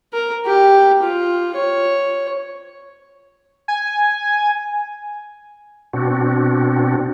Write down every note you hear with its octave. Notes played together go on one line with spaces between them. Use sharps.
A#4
G4
F4
C#5
G#5
B2 C4 D4 F#4